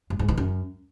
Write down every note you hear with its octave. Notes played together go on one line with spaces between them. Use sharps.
G2
G#2
D#3
F#2